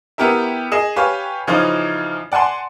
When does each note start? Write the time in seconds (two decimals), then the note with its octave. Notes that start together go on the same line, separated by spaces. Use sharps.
0.18 B3 E4 G4 A#4 E5
0.72 G#4 D#5 E7
0.96 G4 B4 C#5 F5 G#5
1.47 C#3 E3 F3 D#4 F4
2.32 D5 F#5 G#5 A5 C6